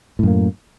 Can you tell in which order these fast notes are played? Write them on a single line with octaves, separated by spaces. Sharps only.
A2 F#2 A#3